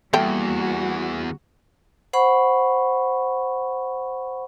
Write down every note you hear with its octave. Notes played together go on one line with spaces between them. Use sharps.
E2 G3 A3 A#3 F#4 G5
C5 F#5 B5 C#6